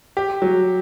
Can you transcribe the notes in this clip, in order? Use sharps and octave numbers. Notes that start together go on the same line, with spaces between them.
G4
F#3